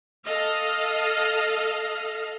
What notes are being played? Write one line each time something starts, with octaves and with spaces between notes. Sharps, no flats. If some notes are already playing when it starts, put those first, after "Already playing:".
A4 D#5 F5